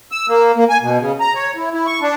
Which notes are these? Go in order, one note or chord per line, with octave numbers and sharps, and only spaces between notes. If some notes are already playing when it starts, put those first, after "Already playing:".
E6
A#3
A#3
G#5
B2
C#3
A#5
C#5
E4
E4
C#6
D4